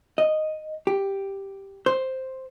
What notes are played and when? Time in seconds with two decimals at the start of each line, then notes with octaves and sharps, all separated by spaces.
0.18 D#5
0.87 G4
1.86 C5